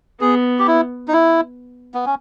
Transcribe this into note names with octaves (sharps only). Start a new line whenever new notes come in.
B3 G#4
G4
E4
D#4
E4
B3
C#4